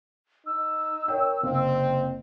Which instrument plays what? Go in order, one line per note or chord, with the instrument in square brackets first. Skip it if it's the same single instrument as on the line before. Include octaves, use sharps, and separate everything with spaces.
[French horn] D#4 [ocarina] E6
[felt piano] A#4 C#5 G5
[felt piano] F#1 C3 F5 [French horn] C4